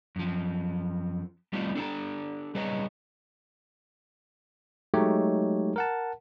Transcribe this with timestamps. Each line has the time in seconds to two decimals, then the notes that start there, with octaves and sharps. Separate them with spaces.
0.16 F#2 F3
1.53 G3 A3 C4 D#4 F4 G4
1.75 D4 G4 A4 C5 A5 A#5
2.55 G3 G#4 B4 C#5 D#5 A#5
4.94 F#3 G#3 A3 D#4 G4 C#5
5.76 A#4 F#5 A5